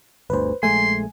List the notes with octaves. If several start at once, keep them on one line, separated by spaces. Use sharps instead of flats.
G1 D2 B4 C5
A#1 G#3 A3 G#5 C6